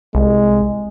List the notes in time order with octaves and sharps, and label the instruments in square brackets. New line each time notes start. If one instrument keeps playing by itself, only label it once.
[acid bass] C2 [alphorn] G#3